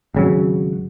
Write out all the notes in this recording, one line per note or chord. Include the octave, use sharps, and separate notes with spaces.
G#1 C#3 F#3